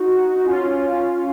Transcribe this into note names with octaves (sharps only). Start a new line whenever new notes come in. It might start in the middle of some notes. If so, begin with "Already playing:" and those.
Already playing: D#4 F#4
D#4
C#4 F4